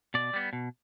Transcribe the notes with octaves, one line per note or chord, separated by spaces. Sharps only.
B2 D5
G3 B3
B2